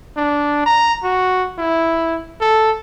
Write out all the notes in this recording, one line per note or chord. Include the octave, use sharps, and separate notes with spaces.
D4
A#5
F#4
E4
A4